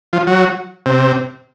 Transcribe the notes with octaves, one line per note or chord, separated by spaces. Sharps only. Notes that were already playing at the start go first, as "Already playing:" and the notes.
F3
F#3
C3